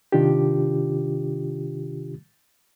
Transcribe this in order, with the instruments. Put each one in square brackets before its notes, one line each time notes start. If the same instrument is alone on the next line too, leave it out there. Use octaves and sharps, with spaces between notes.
[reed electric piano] C3 D#3 D4 F4 G4